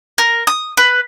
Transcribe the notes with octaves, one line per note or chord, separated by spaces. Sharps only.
A#4
D#6
B4